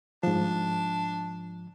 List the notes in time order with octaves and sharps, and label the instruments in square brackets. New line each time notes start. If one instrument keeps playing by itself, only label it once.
[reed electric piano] G#2 F3 [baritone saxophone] D4